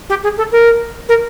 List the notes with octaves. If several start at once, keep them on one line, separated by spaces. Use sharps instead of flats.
G4
G#4
A4
A#4
A#4